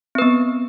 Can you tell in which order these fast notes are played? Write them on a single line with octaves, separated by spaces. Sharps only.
C4 B4 B3